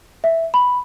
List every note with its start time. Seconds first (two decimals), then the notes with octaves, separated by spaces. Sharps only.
0.24 E5
0.54 B5